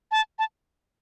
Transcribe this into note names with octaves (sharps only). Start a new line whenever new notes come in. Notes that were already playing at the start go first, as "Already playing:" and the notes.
A5
A5